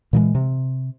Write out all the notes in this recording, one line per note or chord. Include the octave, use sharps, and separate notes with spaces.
A#2 E3 F#3 G#3
C3